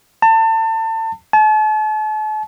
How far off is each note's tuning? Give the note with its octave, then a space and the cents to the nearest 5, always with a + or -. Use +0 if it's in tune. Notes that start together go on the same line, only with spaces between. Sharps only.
A5 +30
A5 -40